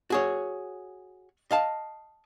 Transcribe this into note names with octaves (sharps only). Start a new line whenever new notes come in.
F#4 G#4 C#5
D#5 F5 A5